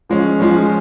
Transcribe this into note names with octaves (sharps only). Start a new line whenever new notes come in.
F3 G#3 C#4
F3 G#3 C#4